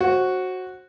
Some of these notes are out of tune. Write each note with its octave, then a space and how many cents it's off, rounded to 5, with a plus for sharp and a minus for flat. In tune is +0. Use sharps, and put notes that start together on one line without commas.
F#4 +0 C5 +30